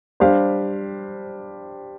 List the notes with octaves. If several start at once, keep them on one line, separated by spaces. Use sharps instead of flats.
G3 D4 G4 C5 F5